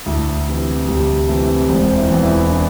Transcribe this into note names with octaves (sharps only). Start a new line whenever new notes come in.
D2 E4
C3 E3
D2 G3
C3 E3 A3
E1 C4
E4
E2 E3
E4
D4